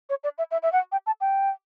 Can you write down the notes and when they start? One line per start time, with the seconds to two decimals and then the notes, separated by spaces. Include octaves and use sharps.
0.10 C#5
0.24 D5
0.38 E5
0.51 E5
0.63 E5
0.72 F#5
0.92 G5
1.07 A5
1.21 G5